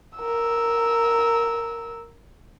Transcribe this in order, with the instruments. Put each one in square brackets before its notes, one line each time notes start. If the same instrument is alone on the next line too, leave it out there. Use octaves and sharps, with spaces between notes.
[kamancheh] A#4 E6